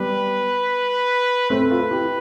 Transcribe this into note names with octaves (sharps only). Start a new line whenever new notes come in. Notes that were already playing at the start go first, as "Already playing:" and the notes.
Already playing: G3 B3 B4
A3 C4 B4
F4 A4
E4 G4